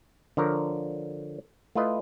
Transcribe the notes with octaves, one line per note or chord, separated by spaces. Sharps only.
D3 F3 A#4 C#5
A3 E4 F4 B4 D#5